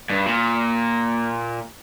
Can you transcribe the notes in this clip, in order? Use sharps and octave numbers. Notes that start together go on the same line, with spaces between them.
G2
A#2